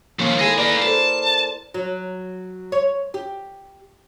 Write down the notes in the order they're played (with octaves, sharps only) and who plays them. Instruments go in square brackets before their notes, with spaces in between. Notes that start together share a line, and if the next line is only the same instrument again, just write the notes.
[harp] D#2 [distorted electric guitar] F3 C#4
[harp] E4 G#4 A4 [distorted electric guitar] D#5 G#5
[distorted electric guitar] A#3 D#5 [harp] B4 D5
[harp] A4 A#4 C5 [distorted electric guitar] A5
[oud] F#3
C#5
G4